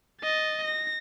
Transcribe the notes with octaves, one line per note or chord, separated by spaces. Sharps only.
D#5 A6
A#6